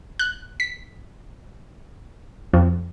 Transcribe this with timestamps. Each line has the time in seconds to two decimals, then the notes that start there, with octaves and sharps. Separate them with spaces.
0.19 F#6
0.60 B6
2.53 F2